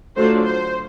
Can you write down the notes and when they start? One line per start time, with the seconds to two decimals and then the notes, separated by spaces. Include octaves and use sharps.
0.16 D3 F#3 A3 D4 F4 C5
0.45 C5